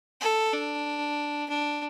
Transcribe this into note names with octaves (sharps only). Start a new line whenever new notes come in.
A4
D4
D4